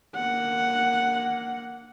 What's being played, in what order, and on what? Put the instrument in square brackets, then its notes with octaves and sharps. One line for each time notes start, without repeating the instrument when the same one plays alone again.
[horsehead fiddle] A#3 F#5